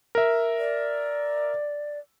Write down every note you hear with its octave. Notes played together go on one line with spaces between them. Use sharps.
A#4 E5
D5